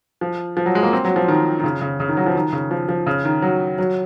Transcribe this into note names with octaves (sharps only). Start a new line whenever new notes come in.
F3
F3
F#3
G#3
A#3
C4
F#3
F3
D#3
D#3
C#3
C#3
C#3
D#3
F#3
F3
D#3
C#3
F3
F3
C#3
D#3
F#3
F#3